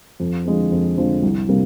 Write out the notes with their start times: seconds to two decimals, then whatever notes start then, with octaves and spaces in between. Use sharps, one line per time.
0.20 F2
0.45 D3 F3 G#3 C4
0.72 F2
0.97 D3 F3 G#3 C4
1.22 C2
1.49 C3 G3 A#3